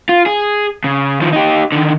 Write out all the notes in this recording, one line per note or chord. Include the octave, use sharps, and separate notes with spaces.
F4
G#4
C#3
D#3 F3
D#4 G4
D3 D#3